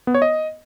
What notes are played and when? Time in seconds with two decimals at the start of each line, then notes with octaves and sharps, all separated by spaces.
0.07 B3
0.14 C#5
0.22 D#5